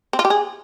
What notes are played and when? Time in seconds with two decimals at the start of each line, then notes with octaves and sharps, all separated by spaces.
0.13 C4
0.19 F4
0.25 G4
0.30 G#4